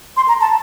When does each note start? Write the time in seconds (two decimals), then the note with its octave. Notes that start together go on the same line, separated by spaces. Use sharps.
0.17 C6
0.28 A#5
0.41 A5